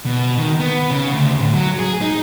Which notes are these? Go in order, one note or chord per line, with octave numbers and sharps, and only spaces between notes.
B2
D#3
B3
C#3
D2
A2
F#3
G#4
D#4